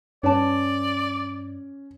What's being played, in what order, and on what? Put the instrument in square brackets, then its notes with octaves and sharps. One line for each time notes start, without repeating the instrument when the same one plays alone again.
[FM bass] G2 [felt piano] C#4 [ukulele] B4 A5 [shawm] D5